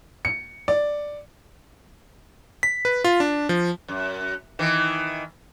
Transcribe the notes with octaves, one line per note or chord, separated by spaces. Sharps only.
C#7
D5
B6
B4
F4
D4
F3
F#2
D#3 E3